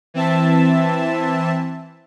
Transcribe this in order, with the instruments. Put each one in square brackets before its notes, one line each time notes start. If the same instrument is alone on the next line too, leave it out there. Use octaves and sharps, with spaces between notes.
[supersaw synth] E3 C4 E5 A5